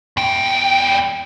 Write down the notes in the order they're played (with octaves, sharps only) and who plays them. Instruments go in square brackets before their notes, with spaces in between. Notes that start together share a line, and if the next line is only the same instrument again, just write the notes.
[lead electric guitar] E2 G5